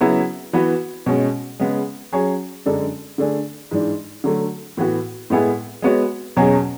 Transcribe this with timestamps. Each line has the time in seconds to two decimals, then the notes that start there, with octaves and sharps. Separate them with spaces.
0.01 C#3 F#3 B3 E4
0.53 E3 B3 F#4 B4
1.06 B2 G#3 C#4
1.60 C#3 G#3 B3
2.12 F#3 C#4 G#4 C#5
2.66 F#2 D3 G#3 D4 A4
3.18 D3 A3 D4 G#4
3.71 G#2 E3 G#3 D4
4.24 D3 F#3 A3
4.77 A2 E3 B3 F#4
5.30 A2 G#3 B3 E4 G#4
5.82 G#3 B3 F#4 C#5
6.36 E2 B2 F#3 C#4 G#4